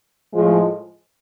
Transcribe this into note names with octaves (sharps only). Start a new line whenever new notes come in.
A2 F3 G#3